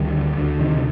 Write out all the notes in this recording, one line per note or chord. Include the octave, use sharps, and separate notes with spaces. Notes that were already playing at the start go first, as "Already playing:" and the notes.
Already playing: D2 D#3 G3
D3
D2
C3 D#3